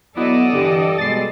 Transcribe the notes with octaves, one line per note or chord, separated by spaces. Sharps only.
F#3 B3 E4 A4 D5 D#5
G2 D3 E3 G4
B2 G3 G#3 A6 C7